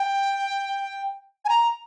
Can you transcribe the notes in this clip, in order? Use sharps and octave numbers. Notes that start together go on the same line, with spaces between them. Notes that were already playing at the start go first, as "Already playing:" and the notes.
Already playing: G5
G#5
A#5